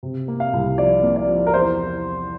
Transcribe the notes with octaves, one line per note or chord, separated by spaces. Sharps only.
C3
A#3
F5
C2
F3 D5
A#3
D5
F3
A#4
E2 C5